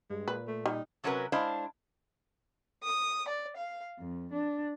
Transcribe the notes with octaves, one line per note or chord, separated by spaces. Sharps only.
G2 G#3
A#2 B4
A3
G3 D#4
C3 F#3 C#4 F#4 A#4 B4
G#3 D4 E4 C5 F5
D#6
D5
F5
F2
D4